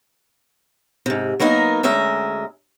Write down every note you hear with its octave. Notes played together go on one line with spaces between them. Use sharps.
G#2 C3
F#3 A#3 B3 D#4 A#4
D2 G#3 C#4 E5 A#5